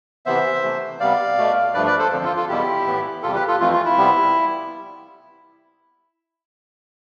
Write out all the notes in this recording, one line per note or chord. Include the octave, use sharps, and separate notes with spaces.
C3 E3 B3 C5 E5
C3 E3 A3
C3 G3 B3 D5 F5
B2 A3
G2 F3 A3 B4 D5
B4 D5
A4 C5
F2 D3 F3
F4 A4
F4 A4
E2 B2 G3 B3 E4 G4
A2 E3 B3
E2 C3 G3 F4 A4
G4 B4
F4 A4
F2 E3 A3 F4
F4
E4
C3 G3 B3